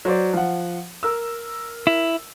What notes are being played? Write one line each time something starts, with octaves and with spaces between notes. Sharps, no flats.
F#3 C5 D5
F3 F#5
A#4 E6
E4